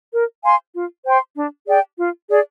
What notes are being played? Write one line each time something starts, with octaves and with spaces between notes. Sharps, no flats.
A#4
F5 G#5 C6
F4
C5 G5 C6
D4
G#4 D5 G5
F4
G#4 D5